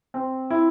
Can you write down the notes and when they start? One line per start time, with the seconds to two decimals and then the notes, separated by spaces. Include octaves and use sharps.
0.14 C4
0.50 E4